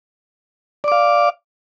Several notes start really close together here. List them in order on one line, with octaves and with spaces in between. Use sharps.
D5 D6 F5